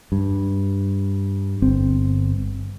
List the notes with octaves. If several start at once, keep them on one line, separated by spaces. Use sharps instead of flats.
G2
G1 C4